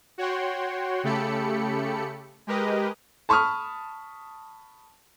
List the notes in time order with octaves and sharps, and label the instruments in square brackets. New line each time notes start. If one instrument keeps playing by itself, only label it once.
[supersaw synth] F#4 C#5 F#5 G5 C6
C#3 A3 G4 A4 B5 C#7
G#3 G4 A#4 B4 D#5
[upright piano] A5 B5 C#6 D#6 F6